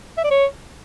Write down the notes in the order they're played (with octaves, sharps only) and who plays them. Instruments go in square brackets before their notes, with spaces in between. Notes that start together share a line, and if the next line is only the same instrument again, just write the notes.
[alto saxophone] E5
D5
C#5